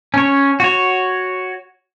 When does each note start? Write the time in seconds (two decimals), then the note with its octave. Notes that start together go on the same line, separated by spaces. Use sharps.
0.14 C#4 C#5
0.60 F#4 C#5